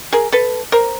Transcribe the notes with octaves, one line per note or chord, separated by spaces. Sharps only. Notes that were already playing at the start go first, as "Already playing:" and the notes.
G#4 A#4
A4 B4
A#4 C5